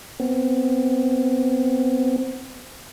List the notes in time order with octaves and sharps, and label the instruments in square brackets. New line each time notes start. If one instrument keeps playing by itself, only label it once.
[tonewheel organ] B3 C4